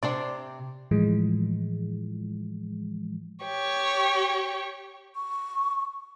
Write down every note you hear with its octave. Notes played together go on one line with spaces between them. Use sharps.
C3 D4 C5 D5
A2 E3 F3 G#3
G4 C#5
C#6